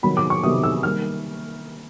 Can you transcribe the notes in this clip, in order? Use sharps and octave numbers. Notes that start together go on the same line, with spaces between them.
C3 D#3 F#3 B3 D#4 B5
D6
C#6
C3 D#3 F#3 B3 D#4 D#6
E6
D#3 G3 A#3 D#4 F6